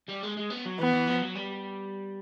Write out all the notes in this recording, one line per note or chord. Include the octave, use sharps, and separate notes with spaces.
G3
G#3
G#3
B3
F#3
E3 B3
E3
F3
F#3
G3